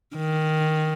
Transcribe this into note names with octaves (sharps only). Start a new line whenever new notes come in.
D#3